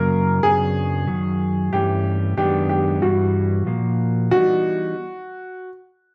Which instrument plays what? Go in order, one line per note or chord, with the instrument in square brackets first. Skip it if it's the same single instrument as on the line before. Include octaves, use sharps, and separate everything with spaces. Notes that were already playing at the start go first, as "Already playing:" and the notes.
Already playing: [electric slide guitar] F#2 C#3 F#3 A#3 [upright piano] A#4
[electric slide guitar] F#2 C#3 F#3 B3 D4 [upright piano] G#4
[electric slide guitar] F#2 D#3 F#3
[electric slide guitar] G2 E3 A3 C#4 [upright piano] G4
[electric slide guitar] F#2 D#3 G#3 B3 D4 [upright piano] G4
[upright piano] G4
[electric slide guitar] G2 E3 G3 [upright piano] F#4
[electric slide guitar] A#2 F3 A#3
[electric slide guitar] E3 G3 B3 D#4 [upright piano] F#4